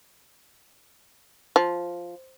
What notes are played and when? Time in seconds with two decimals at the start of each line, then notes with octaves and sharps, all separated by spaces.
1.56 F3